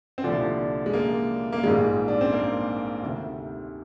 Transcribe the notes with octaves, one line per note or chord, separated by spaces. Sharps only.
C4
C2 A#2 D3 F3 D4
G#3
A#3
A#3
A#1 G#2 D#3 G3 G#3
D4
C4
A#3
D2 C3 D#3